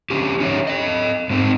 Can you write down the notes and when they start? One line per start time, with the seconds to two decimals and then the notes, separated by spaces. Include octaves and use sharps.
0.10 D3 C#4 G4
0.40 C#4 D#4 C#5 E5
0.67 A4 D#5
1.30 G#2 C4 D#4